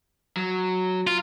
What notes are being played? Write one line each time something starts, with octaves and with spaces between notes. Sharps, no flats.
F#3
F4